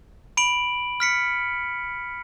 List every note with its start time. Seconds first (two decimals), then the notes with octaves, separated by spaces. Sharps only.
0.37 B5 D7 F#7
1.00 F6 B6 C#7